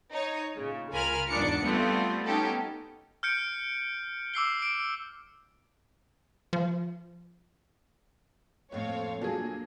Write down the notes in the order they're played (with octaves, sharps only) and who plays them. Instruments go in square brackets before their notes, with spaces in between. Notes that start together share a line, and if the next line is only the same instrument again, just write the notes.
[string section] D#4 C#5
A#2 C#3
C#2 F4 A#4 G#5 B5 F6
E2 G#2 D4 D#4 D6 C#7
G3 A3 B3 C4 F4
B3 C#4 D#4 G4 A4
[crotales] F6 G6 C#7 D7
D6 E6 C7 G7
D7
[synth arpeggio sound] F3
[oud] F2 A2 [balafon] F3 A3 A#3 [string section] C4 C#5 F5
[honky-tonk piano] A#2 F#3 G#4 [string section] A#3 [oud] D4 [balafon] A#4 A5